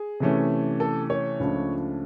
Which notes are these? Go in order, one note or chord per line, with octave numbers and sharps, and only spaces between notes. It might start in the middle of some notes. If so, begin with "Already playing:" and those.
Already playing: G#4
C3 E3 A3 C#4
A4
C#5
C#2 C#3 F3 A3 D4